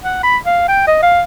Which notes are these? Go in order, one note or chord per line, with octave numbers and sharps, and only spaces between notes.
F#5
B5
F5
G5
D#5
F5